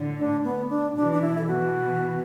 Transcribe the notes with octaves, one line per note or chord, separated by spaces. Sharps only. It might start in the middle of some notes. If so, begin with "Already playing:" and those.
Already playing: A2 D3
D4
B3
D4
B2 E3 D4
D4
E4
A4
B2 E3 F#4